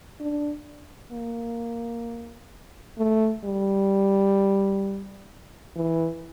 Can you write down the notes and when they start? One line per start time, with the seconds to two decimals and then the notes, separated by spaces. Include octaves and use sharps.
0.20 D4
1.12 A#3
2.98 A3
3.45 G3
5.76 E3